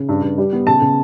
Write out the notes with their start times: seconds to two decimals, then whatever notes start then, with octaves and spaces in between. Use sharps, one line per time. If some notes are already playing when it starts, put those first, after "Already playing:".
Already playing: C#3
0.09 G2
0.22 G2
0.38 G3
0.53 B3
0.67 C#3 A5
0.81 C#3